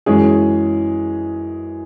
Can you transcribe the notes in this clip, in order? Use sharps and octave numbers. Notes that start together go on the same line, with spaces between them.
F#2 E3 G#3 C#4 G#4